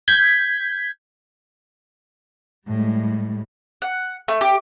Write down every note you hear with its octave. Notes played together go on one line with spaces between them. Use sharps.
G6 G#6 B6
A2 G3 G#3
F#5
A3
G4